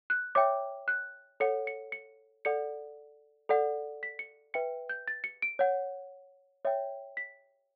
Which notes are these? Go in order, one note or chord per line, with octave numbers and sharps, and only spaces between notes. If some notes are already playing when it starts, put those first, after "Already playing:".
F#6
C#5 E5 G5 D6
F#6
A4 C#5 F#5 C#7
C#7
C#7
A4 D5 F#5 C#7
A4 D5 F#5
B6
C#7
B4 E5 G5 C#7
G6
A6
C#7
D7
C#5 F#5
C#5 E5 G5
B6